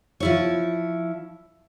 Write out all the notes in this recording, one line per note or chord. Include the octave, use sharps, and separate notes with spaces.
F3 E4 C#5